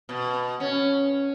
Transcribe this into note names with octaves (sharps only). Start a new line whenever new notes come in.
B2
C#4